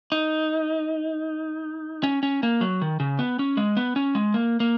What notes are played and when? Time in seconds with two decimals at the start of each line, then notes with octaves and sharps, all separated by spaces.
0.12 D#4
2.03 C#4
2.23 C#4
2.43 A#3
2.61 F#3
2.82 D#3
3.00 C#3
3.19 B3
3.39 C#4
3.57 G#3
3.77 B3
3.96 C#4
4.15 G#3
4.34 A#3
4.60 A#3